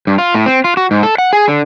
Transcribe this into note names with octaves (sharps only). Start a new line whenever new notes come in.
G2
F4
A2
C4
F4
F#4
G#2
A4
F#5
G#4
D3